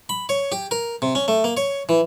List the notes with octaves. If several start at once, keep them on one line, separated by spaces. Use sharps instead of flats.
B5
C#5
G4
A#4
C3
C#4
A3
A#3
C#5
E3